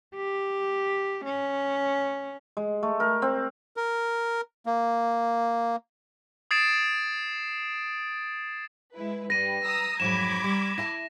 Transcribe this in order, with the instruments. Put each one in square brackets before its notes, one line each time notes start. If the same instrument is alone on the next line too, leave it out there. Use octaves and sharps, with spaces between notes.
[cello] G4
C#4
[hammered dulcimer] G#3
A3
A#4
C4
[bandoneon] A#4
A#3
[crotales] D#6 G#6 A6 C7 D7 E7
[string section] G#3 E4 B4
[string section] G2 G3 [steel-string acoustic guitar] B4 [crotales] A#6 D#7
[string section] A#5 D#6 E6
[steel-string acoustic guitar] F2 G#2 F#3 [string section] B5 D6 G#6 [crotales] E7
[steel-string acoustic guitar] G3
[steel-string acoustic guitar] E4 E5 A5 [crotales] A#6